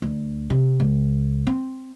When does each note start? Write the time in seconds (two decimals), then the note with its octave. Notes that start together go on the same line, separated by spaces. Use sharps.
0.02 D2
0.50 C3
0.80 C#2
1.47 C4